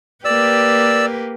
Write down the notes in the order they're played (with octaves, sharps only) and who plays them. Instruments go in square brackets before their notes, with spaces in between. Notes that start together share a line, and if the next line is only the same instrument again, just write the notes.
[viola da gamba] A#3 G4 B4 [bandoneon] D5 E6